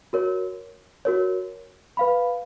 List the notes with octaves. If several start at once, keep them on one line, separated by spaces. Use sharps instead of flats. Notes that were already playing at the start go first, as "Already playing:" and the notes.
F#4 A#4 C#5
F#4 A#4 C#5
B4 F5 B5